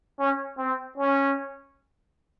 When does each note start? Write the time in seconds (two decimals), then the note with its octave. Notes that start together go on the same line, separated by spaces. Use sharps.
0.19 C#4
0.58 C4
0.97 C#4